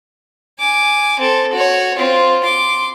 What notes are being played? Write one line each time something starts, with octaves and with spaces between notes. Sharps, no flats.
G#5 D6
C4 A4
F#4 C#5
C4 F4
C6 D6